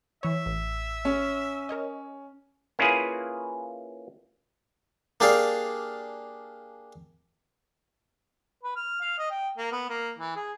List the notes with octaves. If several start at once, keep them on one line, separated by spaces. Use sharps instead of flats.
E3 C#5 E5
A1
C#4
A#4 C#5 D#5
A#3 C#4 E4 F4 G#4 B4
A#3 D4 G4 G#4 D5 F5
B4
F6
F5
D#5
G5
A#3
B3
A#3
E3
G#4